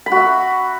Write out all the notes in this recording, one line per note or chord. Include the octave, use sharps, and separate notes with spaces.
B5
F#4
E5